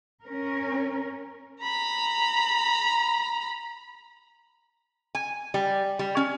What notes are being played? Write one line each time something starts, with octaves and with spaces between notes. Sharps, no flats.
C#4 A#4
A#5 B5
G#5
G3
G3
C#4